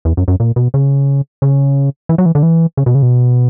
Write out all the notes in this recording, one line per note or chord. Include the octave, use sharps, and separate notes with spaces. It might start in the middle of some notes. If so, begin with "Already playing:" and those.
E2
F#2
F#2
A#2
B2
C#3
C#3
E3
F#3
E3
D3
E3
C#3
B2
C#3
B2